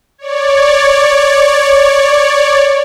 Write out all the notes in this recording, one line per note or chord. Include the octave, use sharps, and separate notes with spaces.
C#5 D5